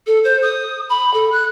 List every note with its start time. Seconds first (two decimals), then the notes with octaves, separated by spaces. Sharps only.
0.06 A4
0.24 C5
0.42 D#6
0.89 B5
1.13 A4
1.32 F#6